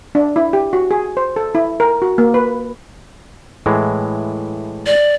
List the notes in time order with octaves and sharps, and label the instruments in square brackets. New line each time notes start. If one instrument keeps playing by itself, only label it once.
[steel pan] D4
E4
G4
F#4
G#4
C5
A4
E4
A#4
F#4
A#3
B4
[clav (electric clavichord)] A2 E3 G#3
[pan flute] D5